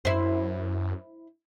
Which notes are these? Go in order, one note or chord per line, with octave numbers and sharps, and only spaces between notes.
F#2 E4 C5